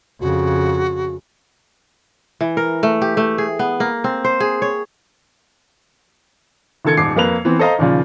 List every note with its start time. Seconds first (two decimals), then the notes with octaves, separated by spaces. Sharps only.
0.21 F2 C#3 F#4
2.41 E3
2.57 A#4
2.83 A3
3.02 G4
3.17 A3
3.38 G#4
3.59 B3
3.80 A#3
4.04 C4
4.24 C5
4.40 G#4
4.62 C#5
6.85 C#2 D#3 A4 G#6 C#7
6.97 D#1 G#2 D6 C7
7.17 F2 A#3 B4 F7
7.45 E3 B3 C4
7.59 A4 C5 D#5 F5 A#5
7.78 D#2 A#2 C#3 F3